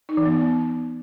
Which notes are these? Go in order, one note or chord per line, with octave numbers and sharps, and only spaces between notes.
D#4
E3
B3
E3
B3